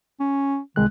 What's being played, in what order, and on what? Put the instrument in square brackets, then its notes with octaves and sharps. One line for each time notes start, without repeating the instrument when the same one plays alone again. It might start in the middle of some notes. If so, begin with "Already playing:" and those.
[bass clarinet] C#4
[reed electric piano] C2 G#3 F#6 [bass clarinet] D#3